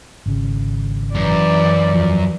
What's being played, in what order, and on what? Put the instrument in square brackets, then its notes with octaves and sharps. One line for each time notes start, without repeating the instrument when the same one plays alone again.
[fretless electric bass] G#1 C#3
[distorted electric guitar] F#2 [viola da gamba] E3 D5
[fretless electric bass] E2 F3